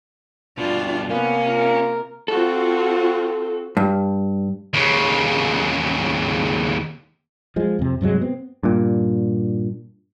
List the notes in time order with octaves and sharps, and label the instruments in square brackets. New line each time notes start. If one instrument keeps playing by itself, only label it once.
[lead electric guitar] G2 B2 [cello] D4 F4
[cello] C3 [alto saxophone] A#3 [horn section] B3 [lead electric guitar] C#4
[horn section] F4 A#4
[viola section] C4 F4 F#4 [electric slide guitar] A4
[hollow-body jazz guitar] G2
[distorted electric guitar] D#2 C#3
[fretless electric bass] F3 G#3
F2 C3
G2 C3 F#3 G#3
B3 C4
[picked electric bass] G2 A#2